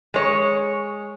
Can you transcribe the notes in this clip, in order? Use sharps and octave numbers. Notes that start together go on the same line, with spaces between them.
G#3 C#5